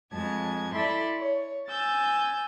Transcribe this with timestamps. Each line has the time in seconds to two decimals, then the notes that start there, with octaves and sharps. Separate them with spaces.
0.12 F2 G#3 A5 G#6
0.74 E4 A4 D5 E5 C6
1.19 C#5
1.68 G#5 E6 G6 A6